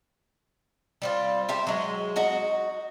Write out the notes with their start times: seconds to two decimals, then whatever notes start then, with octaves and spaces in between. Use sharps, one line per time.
1.02 G3 C4 F4
1.49 G4 C5 E5
1.67 F#3 G#3
2.16 D#4 F#4 F#5